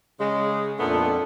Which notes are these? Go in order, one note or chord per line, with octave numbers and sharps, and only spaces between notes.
C#3 G#3
F2 A#2 A3 B3 D4 A4